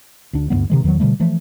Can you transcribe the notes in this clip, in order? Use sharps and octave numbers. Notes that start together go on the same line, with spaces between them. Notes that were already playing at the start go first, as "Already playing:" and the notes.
D2 D4
D2 G2 G3 B3
C3 D#3 G#3
E2 D#3 F3 F#3
B2 D3 G3 A3
E3 F3 A3